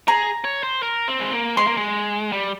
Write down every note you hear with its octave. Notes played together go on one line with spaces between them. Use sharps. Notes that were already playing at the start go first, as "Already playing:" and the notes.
G#4 A#5
C#5
C5
A#4
C4
G#3
A#3
G#3 C6
A#3
G#3
G3